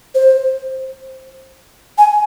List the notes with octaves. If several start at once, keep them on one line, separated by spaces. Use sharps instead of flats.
C5
G#5